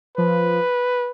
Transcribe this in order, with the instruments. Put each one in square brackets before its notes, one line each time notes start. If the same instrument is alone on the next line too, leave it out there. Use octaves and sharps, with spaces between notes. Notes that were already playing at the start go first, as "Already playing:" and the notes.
[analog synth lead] F3 [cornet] B4